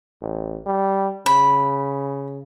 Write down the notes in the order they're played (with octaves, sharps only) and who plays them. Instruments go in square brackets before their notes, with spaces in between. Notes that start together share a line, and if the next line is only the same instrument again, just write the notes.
[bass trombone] A1
G3
[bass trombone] C#3 [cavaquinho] B5